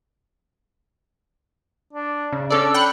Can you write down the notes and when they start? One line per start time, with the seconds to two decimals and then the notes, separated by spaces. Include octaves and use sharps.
1.93 D4
2.33 C#3
2.51 C#4 D4 A4 D5 E6
2.74 G5 B5 F#6 C#7